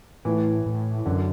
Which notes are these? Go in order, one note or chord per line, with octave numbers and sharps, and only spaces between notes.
A2 E3
A2
F#2 D3